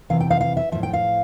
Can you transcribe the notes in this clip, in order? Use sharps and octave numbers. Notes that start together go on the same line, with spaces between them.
C3 E3 F5
G5
F5
F5
E5
A2 F3 E5
G5
F5